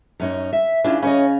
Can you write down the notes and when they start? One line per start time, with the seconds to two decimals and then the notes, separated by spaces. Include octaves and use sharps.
0.20 F#2 C#4 D#4
0.53 E5
0.84 C#3 D4 E4 F4 G#5
1.02 C#3 C#4 C#5 D#5